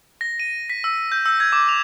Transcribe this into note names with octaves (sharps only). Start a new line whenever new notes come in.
A#6
D#7
B6
E6
G6
E6
G#6
D6
F7